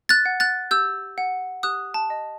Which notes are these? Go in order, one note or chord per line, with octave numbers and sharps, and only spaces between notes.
F#6 A6
F#5
F#6 A6
G4 E6 G6
F#5
G4 D#6 F#6
A5
D#5